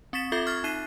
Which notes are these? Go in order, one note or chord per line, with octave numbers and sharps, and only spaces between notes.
C4 C#6 A6 B6 E7
F4 A4 E5 D6 G6 A6
C#6 F6 G#6 A6
D#4 E5 C7 D#7